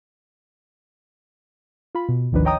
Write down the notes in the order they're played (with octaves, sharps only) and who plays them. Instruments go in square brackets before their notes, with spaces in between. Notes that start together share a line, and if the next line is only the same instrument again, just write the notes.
[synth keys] F4 B5
B2
G#1 D2 D#3 F3 D4 B4
C#5 D#5 G5 A#5 D#6